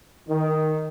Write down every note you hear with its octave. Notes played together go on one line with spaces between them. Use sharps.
D#3